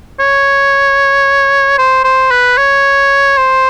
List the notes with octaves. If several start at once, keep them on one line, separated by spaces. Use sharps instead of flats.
C#5
C5
C5
B4
C#5
C5